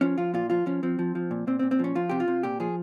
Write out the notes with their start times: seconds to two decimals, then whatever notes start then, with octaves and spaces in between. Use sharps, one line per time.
0.01 F3 C#4
0.18 F3 F4
0.34 A#2 F4
0.50 F3 F4
0.66 F3 C#4
0.83 F3 C4
0.99 F3
1.15 F3
1.31 A#2
1.47 A#2 C4
1.59 C4
1.63 A#2
1.71 C4
1.79 F3 C#4
1.95 F3 F4
2.09 C3 G4
2.20 F4
2.28 C3
2.43 A#2 G4
2.60 F3 G#4